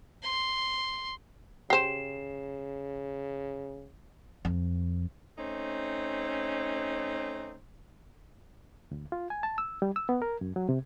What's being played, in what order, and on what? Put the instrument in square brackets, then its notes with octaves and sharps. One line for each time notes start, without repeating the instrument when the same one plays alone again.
[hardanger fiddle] C6
[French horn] C#3 [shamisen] G4 C5 [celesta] C7 E7
[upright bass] F2
[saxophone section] A3 C4 C#4 D#4
[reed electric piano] D2
F4
G#5
A5
E6
G3
E6
B3
A#4
F#2
F#3
C3